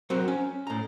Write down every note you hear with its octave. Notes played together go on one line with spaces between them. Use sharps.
F#3 C4 F#4 A#4 C5
C#4
A2 A#5